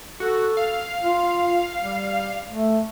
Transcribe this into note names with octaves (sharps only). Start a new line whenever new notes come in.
F#4 A4
F5
F4
G3
A3